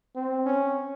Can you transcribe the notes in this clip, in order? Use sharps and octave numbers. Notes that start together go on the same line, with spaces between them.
C4
C#4